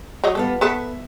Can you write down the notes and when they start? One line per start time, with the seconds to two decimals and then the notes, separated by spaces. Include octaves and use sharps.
0.24 F#3 C#5 D#5
0.35 G3 B3 F4 A4
0.61 B3 A4 B4 E5